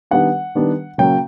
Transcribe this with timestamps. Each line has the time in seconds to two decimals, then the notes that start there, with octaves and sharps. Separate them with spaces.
0.11 D#3 G3 B3 D4 F#5
0.55 D#3 G3 B3 D4
0.98 C#3 F#3 A#3 G5